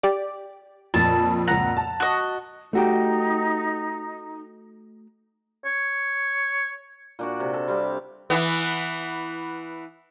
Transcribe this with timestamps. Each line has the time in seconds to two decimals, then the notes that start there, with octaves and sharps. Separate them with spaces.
0.03 G4 D5
0.94 F2 A#2 A5
1.48 C#2 F#5 A#5
1.77 A5
2.00 F#4 D#5
2.73 A3 D#4 F#4 G4
5.65 C#5
7.19 A#2 D4 F#4
7.40 C3
7.54 A4
7.68 G3 C4 E5 F5
8.30 E3 B3